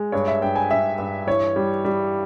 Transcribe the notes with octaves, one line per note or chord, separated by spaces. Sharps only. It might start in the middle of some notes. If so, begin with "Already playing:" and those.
Already playing: G#3
G2 C#5
E5
G2 G5
G#5
G2 E5
G2
E3 C#5
G3
G3